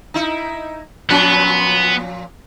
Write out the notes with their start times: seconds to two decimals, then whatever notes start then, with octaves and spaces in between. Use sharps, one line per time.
0.14 D#4 E4
1.10 A#2 F3 B3 C#4